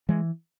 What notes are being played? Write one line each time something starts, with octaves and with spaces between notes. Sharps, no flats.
E3 G#3